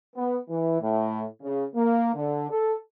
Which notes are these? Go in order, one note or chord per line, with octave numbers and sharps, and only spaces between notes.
B3
E3
A2
C#3
A#3
D3
A4